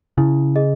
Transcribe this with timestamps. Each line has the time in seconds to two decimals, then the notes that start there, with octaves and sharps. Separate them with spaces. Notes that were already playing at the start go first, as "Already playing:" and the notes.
0.18 C#3 E4
0.56 G#4 D#5